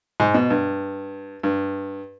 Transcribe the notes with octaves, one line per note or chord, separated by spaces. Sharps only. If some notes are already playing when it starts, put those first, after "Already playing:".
G#2
B2
G2
G2